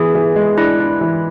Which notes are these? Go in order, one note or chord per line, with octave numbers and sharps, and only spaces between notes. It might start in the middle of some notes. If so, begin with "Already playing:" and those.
Already playing: E3 B3 G#4
E3
G#3
D4 E4
D4
E3